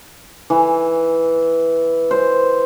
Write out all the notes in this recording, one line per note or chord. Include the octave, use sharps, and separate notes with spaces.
E3
C5